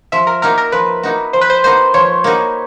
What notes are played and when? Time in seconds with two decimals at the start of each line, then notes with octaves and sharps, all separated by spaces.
0.12 F3 E5
0.27 A#4
0.42 A#3 D#4 F#4 A#4
0.58 A#4
0.72 F3 B4
1.03 A#3 D#4 F#4
1.33 F3 C5
1.41 B4
1.50 C5
1.64 A#3 D#4 F#4 C5
1.94 F3 C#5
2.24 A#3 D#4 F#4